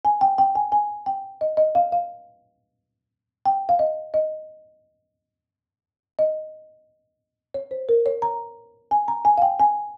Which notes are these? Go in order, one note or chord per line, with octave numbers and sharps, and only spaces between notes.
G#5
G5
G5
G#5
G#5
G5
D#5
D#5
F5
F5
G5
F5
D#5
D#5
D#5
C#5
C5
A#4
C#5
A#5
G#5
A#5
G#5
F5
G5
G#5